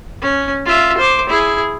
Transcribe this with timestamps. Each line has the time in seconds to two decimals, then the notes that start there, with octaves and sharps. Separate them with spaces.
0.22 C#4
0.66 F4 E5
0.97 C5 D6
1.29 E4 G#4